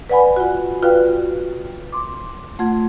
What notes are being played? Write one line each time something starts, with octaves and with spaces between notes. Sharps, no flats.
B4 D5 F#5 G#5 B5
F4 F#4
F4 F#4 B4 D5 F5 G5
C6 D6
A3 F4 F#5 C6 G#6